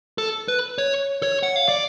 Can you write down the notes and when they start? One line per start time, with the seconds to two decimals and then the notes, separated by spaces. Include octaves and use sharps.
0.18 A4
0.48 B4
0.78 C#5
1.23 C#5
1.43 F#5
1.56 F5
1.69 D5